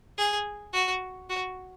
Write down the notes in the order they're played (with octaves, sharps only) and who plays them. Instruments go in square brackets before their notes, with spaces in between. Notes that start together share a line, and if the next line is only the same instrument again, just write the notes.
[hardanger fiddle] G#4
F#4
F#4